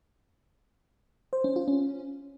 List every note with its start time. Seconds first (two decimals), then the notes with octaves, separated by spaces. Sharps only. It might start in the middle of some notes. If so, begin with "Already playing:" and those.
1.33 C5
1.44 C#4
1.56 F4
1.68 C#4